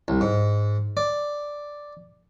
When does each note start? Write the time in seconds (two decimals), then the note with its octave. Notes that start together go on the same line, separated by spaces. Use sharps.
0.08 C2
0.21 G#2
0.97 D5